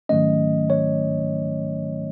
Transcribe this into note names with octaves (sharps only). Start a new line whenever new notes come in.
G#2 D#3 F#3 A3 C#4 D#5
C#5